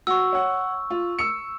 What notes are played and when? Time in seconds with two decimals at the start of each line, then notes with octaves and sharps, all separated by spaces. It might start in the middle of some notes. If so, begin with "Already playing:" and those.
0.07 F#4 C#6 E6
0.33 C#5 F#5
0.90 F4
1.19 E6 C#7